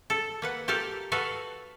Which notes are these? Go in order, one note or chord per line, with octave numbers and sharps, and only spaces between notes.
A4
A#3 B4 F#5
G4 A4 A#4 F5 A5
F#4 A4 B4 F5